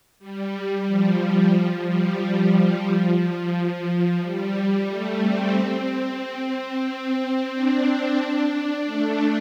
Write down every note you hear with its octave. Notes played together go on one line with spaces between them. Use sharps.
G3
F3
F3
G3
F3
G3
A3
C4
C4
D4
A3